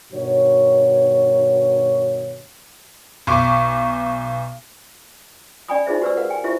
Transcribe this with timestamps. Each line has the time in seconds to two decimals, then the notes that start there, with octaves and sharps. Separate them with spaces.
0.13 G2 B2 D#3 F#4 C#5
3.27 B1 C#6 D6
5.69 C#4 D5 G5 G#5 B5 D#6
5.86 D#4 F4 G#4 C5 E5
6.02 F#4 G4 B4 C5 D5 E6
6.17 A#4 B4 F5 F#5
6.30 G5 G#5
6.44 E4 F4 G4 C5 E5